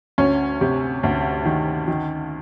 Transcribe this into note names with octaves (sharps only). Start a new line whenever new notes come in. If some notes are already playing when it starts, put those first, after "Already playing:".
D2 C#4
C3
D2
D#3
D#3